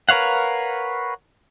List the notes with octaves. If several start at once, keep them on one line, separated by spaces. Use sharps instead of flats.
A#4 B4 C#5 F5 F#5